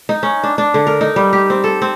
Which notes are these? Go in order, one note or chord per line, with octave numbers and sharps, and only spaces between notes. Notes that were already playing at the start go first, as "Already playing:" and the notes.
D#4
C#4
D4
D4
D3
A#4
D#4
G3
G4
C4
A4
C4